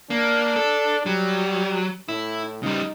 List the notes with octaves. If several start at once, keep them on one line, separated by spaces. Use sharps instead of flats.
A#3 D4
A4
F#3 G3
A2 E4
C#3 G3 D#4